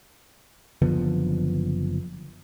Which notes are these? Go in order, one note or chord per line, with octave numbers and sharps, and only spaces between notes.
F#1 D3 F3 B3